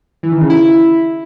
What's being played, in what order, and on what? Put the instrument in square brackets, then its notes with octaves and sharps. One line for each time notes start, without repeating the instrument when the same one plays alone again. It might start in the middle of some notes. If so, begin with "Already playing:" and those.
[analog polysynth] E3
D#3
C#3
E4